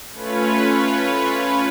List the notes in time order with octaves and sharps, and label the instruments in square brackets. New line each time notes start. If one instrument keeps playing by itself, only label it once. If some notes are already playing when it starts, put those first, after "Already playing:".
[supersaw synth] A3 C#4 F4 B4 C#5